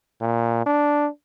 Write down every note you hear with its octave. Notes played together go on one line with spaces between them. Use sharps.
A#2
D4